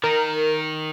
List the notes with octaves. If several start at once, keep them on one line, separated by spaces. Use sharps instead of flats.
D#3 A#4